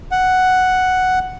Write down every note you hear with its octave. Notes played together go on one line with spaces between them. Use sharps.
F#5